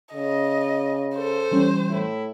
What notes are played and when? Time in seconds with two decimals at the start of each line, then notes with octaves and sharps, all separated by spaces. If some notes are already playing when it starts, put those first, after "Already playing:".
0.14 C#3 D#5
1.18 A4 C5
1.52 E3 G3 C#4
1.89 A2 E4